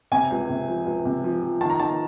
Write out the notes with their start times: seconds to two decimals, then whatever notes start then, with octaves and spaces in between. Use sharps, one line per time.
0.12 C3 G#5
0.31 C#2
0.50 C3
0.68 F3
0.86 C#2
1.05 C3
1.24 F3
1.42 F3
1.61 D#3 A5
1.70 A#5
1.79 D#3 A5